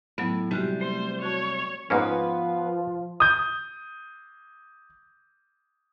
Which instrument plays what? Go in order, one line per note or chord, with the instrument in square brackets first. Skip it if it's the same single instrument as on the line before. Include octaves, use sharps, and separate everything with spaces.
[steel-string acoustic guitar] A2 [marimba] F#3 B3
[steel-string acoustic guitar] C3 G3 [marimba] G#3 F#4 G4
[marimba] A3 [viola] C5
[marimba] F#4 A5 [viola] C#5
[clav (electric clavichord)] G#2 A#3 C#4 [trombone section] F3 F4 [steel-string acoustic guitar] B3 B4
[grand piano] D#6 G6